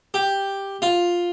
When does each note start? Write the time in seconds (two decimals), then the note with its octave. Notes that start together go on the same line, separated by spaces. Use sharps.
0.14 G4
0.82 F4